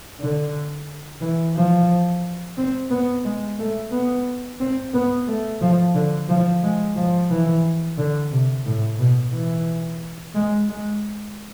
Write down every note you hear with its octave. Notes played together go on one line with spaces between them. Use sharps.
D3
E3
F3
C4
B3
G#3
A3
B3
C4
B3
A3
F3
D3
F3
G#3
F3
E3
D3
C3
A2
B2
E3
G#3
G#3